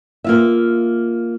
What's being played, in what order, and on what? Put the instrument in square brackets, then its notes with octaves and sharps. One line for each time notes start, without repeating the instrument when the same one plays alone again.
[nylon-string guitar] A#3 F4 E5